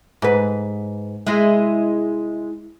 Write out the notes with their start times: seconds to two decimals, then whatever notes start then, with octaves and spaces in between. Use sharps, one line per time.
0.22 G#2 B4
1.27 G#3 E4